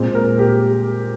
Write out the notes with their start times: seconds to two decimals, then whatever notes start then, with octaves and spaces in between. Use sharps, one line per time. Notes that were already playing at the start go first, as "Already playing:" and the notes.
Already playing: A#2 G#3 C4
0.15 A#4
0.39 G4